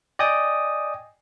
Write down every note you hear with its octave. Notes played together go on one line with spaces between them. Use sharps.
D5 D#5 G5 G#5 D#6